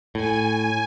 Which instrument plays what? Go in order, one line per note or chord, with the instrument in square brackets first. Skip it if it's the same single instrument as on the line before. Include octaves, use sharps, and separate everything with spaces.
[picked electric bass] A2 [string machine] G#5